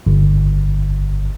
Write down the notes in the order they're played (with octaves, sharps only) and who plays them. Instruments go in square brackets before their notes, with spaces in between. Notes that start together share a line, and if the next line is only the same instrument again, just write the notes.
[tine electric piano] G1